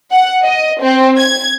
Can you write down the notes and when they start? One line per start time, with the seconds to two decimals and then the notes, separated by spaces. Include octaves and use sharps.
0.12 F#5
0.44 D#5
0.82 C4
1.18 G#6